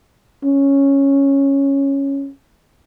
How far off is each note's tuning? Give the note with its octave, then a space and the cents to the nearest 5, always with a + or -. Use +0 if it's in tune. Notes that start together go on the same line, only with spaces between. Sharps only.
C#4 -5